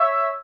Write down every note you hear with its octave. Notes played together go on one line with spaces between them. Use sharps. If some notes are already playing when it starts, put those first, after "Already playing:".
Already playing: C#5 E5